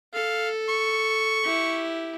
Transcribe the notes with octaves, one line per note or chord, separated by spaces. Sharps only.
A4 F5
C#6
E4 G4